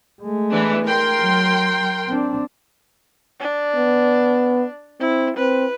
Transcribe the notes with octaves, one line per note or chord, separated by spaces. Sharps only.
G#3 A3
E3 B3 D4
A#4 G5 C6
F#3
C4 D4
D4
B3
C4 E4
C4 B4